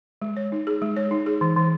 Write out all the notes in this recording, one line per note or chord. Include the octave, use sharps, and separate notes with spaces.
G#3
C#5
D#4
G#4
G#3
C#5
D#4
G#4
E3
E3